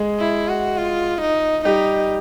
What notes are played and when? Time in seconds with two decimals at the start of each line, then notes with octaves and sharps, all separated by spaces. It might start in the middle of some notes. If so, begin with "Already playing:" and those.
Already playing: G#3 G#4
0.19 E4
0.49 F#4
0.78 F4
1.21 D#4
1.65 G3 D#4 G4